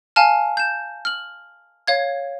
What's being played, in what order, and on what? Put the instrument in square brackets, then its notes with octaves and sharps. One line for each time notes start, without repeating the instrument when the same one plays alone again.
[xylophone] F5 G#5 A5 F6
G6 E7
F6 F#7
C#5 F5 G#6